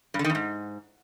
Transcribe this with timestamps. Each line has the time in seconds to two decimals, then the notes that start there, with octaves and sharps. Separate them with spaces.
0.14 G2
0.19 D3
0.24 D#3
0.30 E2
0.35 G#2